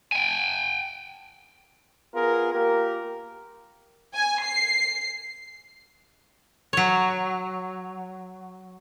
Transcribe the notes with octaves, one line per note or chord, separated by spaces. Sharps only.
G5 G#5
B3 F4 G#4 A#4
A#3 F4 G4 A#4
G#5
C7
F#3 C#5